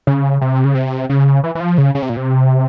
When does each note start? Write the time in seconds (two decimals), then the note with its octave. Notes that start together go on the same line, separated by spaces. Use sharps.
0.07 C#3
0.41 C3
0.65 C#3
0.75 C3
1.09 C#3
1.44 E3
1.55 E3
1.60 F3
1.78 C#3
1.95 C#3
2.02 C3
2.09 A#2
2.17 C3